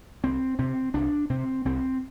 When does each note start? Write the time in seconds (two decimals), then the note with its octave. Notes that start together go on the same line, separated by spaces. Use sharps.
0.24 C2 C4
0.59 C3 C4
0.94 C2 D4
1.30 C3 C4
1.65 C2 C4